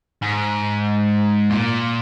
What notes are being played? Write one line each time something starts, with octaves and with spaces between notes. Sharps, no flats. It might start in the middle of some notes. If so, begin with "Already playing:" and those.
G#2
A#2